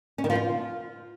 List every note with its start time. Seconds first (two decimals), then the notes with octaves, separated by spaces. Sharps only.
0.18 C#4
0.24 D#3
0.30 F3
0.35 F4